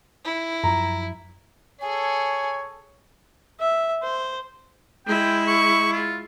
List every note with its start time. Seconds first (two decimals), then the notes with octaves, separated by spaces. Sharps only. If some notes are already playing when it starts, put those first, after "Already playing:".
0.24 E4
0.64 F#2 F3 F#3 A#5
1.81 G#4 A4 C#5 G#5
3.60 E5
4.03 C5
5.07 G#3 E4 G5
5.48 C#6
5.93 F4